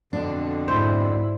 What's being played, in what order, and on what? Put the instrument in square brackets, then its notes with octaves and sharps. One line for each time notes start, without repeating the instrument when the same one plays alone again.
[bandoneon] F2 B2 D3 [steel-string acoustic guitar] D4
[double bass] G#2 E4 [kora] C5